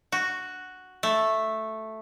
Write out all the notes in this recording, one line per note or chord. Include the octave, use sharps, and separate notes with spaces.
F#4
A3